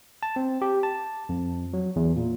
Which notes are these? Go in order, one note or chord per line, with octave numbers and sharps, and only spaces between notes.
A5
C4
G4
A5
F2
F#3
E2
A#2